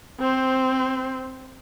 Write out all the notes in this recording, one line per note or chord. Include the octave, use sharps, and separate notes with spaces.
C4 C5